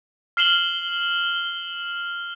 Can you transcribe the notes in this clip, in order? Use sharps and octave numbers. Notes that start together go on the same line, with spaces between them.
F6 C7 E7 F#7 G7